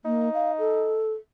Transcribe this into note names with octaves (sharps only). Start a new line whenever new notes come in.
A#3 D#4
F5
A4